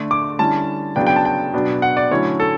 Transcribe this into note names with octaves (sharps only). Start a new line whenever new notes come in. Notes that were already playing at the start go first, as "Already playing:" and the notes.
Already playing: D3 A3 D4
D6
D3 G3 C#4 E4 A5
C#3 F#3 B3 D4 G5
G5
A5
G5
B2 F#3 B3 D4
F#5
D5
D3 F#3 A3 C#4 E4 C#5
A4